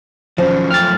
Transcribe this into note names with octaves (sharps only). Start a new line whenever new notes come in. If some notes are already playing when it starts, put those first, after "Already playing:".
D#3 F3 F#3 C#4
F#2 A3 G5 F6 A6